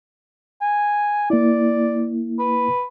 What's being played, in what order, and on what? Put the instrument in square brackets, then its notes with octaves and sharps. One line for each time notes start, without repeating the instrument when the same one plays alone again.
[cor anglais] G#5
[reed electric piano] A#3 E4 [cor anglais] D5
[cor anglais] B4